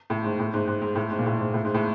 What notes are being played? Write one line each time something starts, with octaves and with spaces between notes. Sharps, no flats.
A2
G#2
A2
G#2
G#2
G#2
A2
G#2
A#2
A2
G#2
A2
G#2
A2